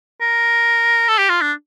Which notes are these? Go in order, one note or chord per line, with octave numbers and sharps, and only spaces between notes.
A#4
A4
G4
F4
D4